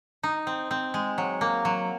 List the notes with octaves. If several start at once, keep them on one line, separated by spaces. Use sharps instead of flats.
D#4
C4
C4
G#3
F#3
A#3
F#3